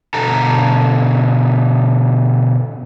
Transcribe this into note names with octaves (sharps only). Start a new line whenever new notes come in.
B2 D3 A4 A5 A#5